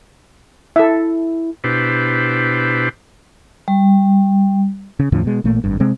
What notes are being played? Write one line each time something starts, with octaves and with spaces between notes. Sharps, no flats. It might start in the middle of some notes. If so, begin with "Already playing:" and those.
E4 A4 E5
B2 D4 E4 G4 B4 C5
G3
C#3
E2 A2 D3 F3
B2 G#3
A1 A#2 A3 A#3
G#1 G2
C3 G#3 C4